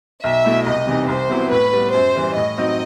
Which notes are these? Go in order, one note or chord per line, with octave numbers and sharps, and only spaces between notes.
B1 E5
B2 A3 E4
C2 D#5
C3 E3 G3 D#4
C2 C5
C3 F#3 B3 E4
A2 B4
G3 B3
F#2 C5
E3 G3
A2 D#5
F#3 C4 D#4